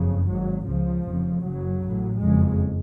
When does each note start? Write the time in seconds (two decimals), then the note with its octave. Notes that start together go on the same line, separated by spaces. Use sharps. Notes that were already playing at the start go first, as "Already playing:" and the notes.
Already playing: F#1 F2 C#3
0.28 G#1 G#2 F#3
0.66 C#2 C#3 F3
1.05 F1 F2 C#3
1.43 F#1 F#2 C#3 F#3
1.81 A1 A2
2.20 F#1 F2 C#3 G#3